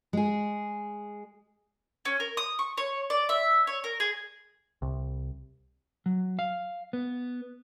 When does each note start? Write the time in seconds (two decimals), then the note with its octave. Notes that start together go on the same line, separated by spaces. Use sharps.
0.13 G#3 G#4
2.05 C#4
2.20 A#4
2.37 D#6
2.59 C#6
2.77 C#5
3.10 D5
3.29 E5
3.67 C#5
3.84 A#4
4.00 G#4
4.82 C2
6.06 F#3
6.39 F5
6.93 B3